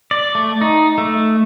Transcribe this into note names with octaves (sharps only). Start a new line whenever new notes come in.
D5
A3
D#4
A3